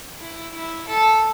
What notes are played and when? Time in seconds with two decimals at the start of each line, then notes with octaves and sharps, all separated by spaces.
0.21 E4
0.54 E4
0.87 A4